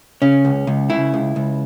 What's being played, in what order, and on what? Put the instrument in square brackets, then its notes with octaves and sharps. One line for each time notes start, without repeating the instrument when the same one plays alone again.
[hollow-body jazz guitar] C#3 C#4
C#2
C#2
C#3 E4
C#2
C#2